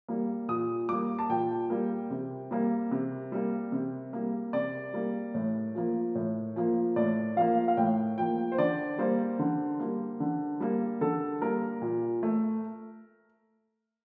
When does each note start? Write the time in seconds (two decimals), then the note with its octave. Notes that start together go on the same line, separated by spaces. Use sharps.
0.09 G3 A#3
0.49 A#2 D#6
0.89 G3 A#3 D6
1.19 A5
1.30 A#2 G5
1.70 G3 A#3
2.10 C3
2.51 G3 A#3
2.91 C3
3.32 G3 A#3
3.72 C3
4.13 G3 A#3
4.53 C3 D5
4.94 G3 A#3
5.34 A2
5.75 F3 A#3
6.15 A2
6.56 F3 A#3
6.96 A2 D5
7.36 F3 A#3 F5
7.68 F5
7.77 A2 G5
8.18 F3 A#3 G5
8.52 C5
8.58 D3 D5
8.98 G3 A#3 C5
9.39 D3
9.80 G3 A#3
10.20 D3
10.60 G3 A#3
11.01 D3 A4
11.42 G3 A#3 A#4
11.82 A#2
12.23 A3